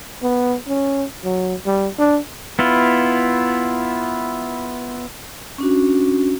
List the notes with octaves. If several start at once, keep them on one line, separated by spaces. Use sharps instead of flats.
B3
C#4
F#3
G3
D4
B3 E4 F4
C#4 D4 F#4